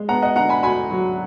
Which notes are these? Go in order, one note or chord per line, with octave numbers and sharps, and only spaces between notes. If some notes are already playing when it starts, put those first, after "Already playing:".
Already playing: G#3
B3 F#5 A#5
D#5 F#5
D3 F#5 A#5
G#5 B5
D2 G#5 B5
F#3